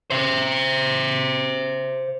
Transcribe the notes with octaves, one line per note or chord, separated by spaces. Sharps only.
C5 E5